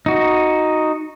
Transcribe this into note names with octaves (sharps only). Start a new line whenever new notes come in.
D#4 F#4